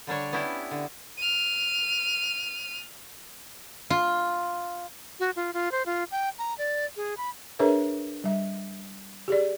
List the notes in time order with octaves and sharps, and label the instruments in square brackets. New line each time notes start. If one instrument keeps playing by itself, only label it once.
[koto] D3 G3 D4 C#5
B3 C#4 D4 E4 G4
D3
[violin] F6 D#7
[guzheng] F4
[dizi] F#4
F4
F4
C5
F4
G5
A#5
D5
G#4
B5
[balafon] D4 G#4 A#4 B4 C#5 E5
G3 E5
G4 G#4 D5